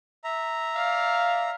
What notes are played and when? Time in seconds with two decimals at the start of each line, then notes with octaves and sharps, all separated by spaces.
0.24 E5 A#5
0.76 D5 F5